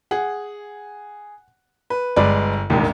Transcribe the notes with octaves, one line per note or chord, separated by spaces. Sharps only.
G#4 F#5
B4
G1 G#3 B4 D5
E1 A1 D#2